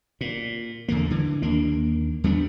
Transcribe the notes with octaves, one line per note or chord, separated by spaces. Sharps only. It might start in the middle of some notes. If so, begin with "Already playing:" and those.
A#2
E2 D3 A#3
D3 E3
D#2 A#3 D4
E2 G3 B3 D4